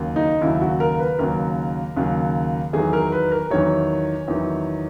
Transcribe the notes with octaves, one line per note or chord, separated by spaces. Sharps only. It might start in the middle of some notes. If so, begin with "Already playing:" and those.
Already playing: D#2 C#3 F#3
D#4
D#2 C#3 F#3 E4
F#4
A#4
B4
D#2 C#3 F#3 A#4
D#2 C#3 F#3
E2 D#3 F#3 G#4
A#4
B4
A#4
E2 D#3 F#3 C#5
E2 D#3 F#3